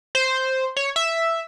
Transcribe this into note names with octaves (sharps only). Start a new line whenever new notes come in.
C5
C#5
E5